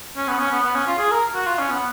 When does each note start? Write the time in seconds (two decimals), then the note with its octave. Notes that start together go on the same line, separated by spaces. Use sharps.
0.17 C#4
0.28 B3
0.39 C#4
0.51 B3
0.63 B3
0.75 C#4
0.87 F4
0.98 G#4
1.11 A#4
1.34 F#4
1.47 F4
1.59 C#4
1.70 B3